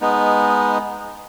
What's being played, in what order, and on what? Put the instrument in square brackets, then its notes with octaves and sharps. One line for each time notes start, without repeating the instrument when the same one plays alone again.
[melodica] G#3 B3 D#4